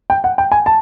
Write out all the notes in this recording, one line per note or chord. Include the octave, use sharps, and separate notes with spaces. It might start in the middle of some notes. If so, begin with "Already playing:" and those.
G5
F#5
G5
G#5
A5